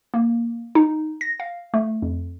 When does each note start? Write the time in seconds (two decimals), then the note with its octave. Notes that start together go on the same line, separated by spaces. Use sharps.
0.14 A#3
0.75 D#4
1.21 A#6
1.40 F5
1.74 A3
2.02 F2